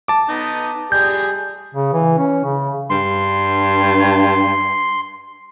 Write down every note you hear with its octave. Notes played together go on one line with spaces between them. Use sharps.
A5 D6
B3 D#4
G3 G#4 G6
C#3
E3
C#4
C#3
G2 C6